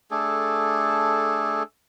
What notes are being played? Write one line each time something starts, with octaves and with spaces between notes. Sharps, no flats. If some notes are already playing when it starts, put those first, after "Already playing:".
A3 D4 G#4 A4